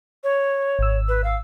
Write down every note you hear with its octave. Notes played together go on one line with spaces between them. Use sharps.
C#5
G#1 E6
B4
F5